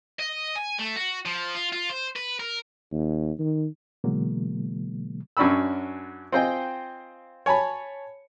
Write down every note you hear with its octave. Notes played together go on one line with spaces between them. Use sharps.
D#5
G#5
A3
F#4
F3
F4
F4
C5
B4
A#4
D#2
D#3
B2 D3 E3 F#3 G#3 A#3
F#2 C#4 D4 F#4 B5 E6
C4 F4 C5 D#5 G5 G#5
C#5 G#5 A5 B5